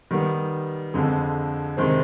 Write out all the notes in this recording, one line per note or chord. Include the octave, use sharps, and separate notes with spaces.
D#3 G3 B3
F2 D3 G#3
C3 D#3 G#3 C4